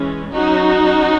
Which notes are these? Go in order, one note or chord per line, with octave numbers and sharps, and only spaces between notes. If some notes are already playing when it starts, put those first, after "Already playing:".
Already playing: E3 G#3 C#4
F#3 C#4 D#4 F#4
F#3 C#4